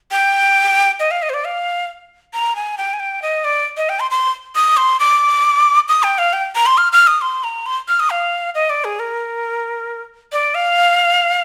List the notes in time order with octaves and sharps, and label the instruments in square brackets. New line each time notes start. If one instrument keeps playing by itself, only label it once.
[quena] G5
D#5
F5
D#5
C5
D5
F5
A#5
G#5
G5
G#5
G5
D#5
D5
D#5
G5
C6
C6
D#6
C6
D6
D#6
G5
F5
G5
A#5
C6
F6
F6
D#6
C6
A#5
C6
F6
D#6
F5
D#5
D5
G#4
A#4
D5
F5